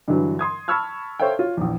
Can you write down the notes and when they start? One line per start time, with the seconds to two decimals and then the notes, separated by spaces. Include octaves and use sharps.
0.08 G2 D3 E3 F#3
0.39 C6 D#6 G#6
0.68 A5 B5 C#6 E6 F6 G#6
1.19 A4 C5 C#5 E5 F5 G5
1.39 F4 C#5
1.57 A#1 E2